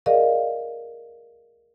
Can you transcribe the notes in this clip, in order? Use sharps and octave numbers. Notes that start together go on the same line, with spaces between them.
G#4 A#4 D5 D#5 F5